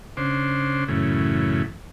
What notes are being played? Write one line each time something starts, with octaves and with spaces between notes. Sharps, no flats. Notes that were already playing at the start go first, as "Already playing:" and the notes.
C#3 D4 C5
F#2 A2 C#3 E3